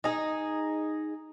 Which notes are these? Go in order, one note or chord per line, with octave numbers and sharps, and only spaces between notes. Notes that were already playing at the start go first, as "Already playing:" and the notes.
D#4 G#4